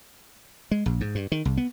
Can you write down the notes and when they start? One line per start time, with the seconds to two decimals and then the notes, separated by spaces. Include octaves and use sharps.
0.71 G#3
0.86 A#1
1.01 G#2
1.15 G2
1.32 D#3
1.45 C2
1.57 B3